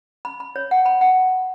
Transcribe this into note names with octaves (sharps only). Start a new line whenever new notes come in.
B5
B5
C#5
F#5
B5
F#5